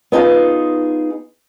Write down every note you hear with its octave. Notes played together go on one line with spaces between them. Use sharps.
B3 D#4 F4 G#4